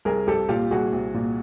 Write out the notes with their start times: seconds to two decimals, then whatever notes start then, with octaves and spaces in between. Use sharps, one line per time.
0.05 C2 G#4 A#4
0.27 C2 G4 A4
0.49 A#2 F4 G4
0.71 C2 F#4 G#4
0.93 C2
1.14 A#2